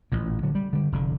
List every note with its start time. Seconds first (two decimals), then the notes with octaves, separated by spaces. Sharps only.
0.12 A1 A#2
0.43 D3 F#3
0.55 G3
0.73 D3 G3
0.92 F1 D3